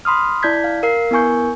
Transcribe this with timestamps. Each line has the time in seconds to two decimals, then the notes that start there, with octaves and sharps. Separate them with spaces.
0.05 B5 C6 D#6 F6
0.42 E4 D5 A5 G6 G#6 B6
0.64 F5
0.83 A#4 F5 C7
1.11 B3 E4 A#4 G#5 C#6 G6